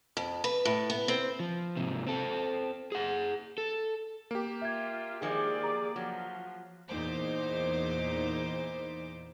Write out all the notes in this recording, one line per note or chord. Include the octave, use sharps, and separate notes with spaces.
F2
B4
A2
B3
C4
F3
G#2 C3
C4 A4
G#4 F#5
A4
A#3 G4
F4 E5 G#6
D#3 F3 G#3 G#4 D5
A#5
F3 F#3
E2 A#2 D#4 C5 D6